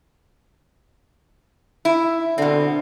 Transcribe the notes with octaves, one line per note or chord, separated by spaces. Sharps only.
E4
B2 D3 C4